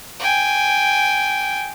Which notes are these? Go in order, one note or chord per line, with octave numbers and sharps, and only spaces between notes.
G5 G#5